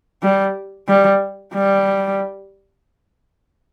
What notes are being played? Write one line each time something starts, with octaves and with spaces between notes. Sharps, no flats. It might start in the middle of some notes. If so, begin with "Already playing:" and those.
G3
G3
G3